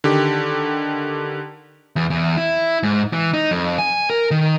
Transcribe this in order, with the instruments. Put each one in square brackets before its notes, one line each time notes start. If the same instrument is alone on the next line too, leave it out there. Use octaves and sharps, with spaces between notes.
[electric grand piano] D3 D#3 G4
[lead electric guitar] E2
E2
E4
G#2
E3
D#4
F2
G#5
A#4
D#3